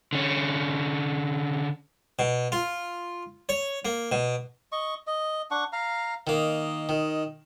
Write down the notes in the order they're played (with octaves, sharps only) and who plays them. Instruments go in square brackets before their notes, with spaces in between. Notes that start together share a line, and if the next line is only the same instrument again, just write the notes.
[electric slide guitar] D3 C#4
[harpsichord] B2
F4
C#5
A#3
B2
[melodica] D#5 C#6
D#5
D4 F#5 C#6
F5 A#5
[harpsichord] D#3 A#3 [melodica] D#5
[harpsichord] D#3